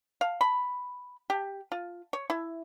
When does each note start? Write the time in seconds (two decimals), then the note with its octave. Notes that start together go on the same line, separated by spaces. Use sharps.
0.21 F5
0.41 B5
1.30 G4
1.72 F4
2.13 C#5
2.30 E4